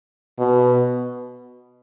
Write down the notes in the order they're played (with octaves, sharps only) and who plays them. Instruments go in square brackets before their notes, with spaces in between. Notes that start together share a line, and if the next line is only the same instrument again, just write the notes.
[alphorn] B2